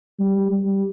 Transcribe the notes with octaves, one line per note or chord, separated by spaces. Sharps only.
G3
G3